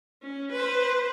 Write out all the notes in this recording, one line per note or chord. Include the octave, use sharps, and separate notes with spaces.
C#4
B4 C5